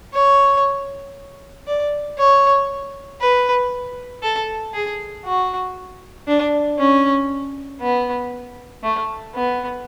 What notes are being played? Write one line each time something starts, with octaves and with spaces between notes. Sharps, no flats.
C#5
D5
C#5
B4
A4
G#4
F#4
D4
C#4
B3
A3
B3